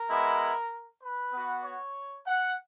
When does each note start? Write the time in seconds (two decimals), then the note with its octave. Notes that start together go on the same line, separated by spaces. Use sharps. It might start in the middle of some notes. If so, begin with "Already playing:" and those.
Already playing: A#4
0.09 G#3 B3 E4
1.02 B4
1.33 B3 F#4
1.64 C#5
2.25 F#5